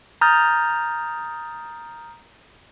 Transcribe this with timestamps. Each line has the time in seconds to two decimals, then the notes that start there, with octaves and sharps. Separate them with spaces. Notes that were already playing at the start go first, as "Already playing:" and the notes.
0.21 A#5 D#6 F6 G6 A6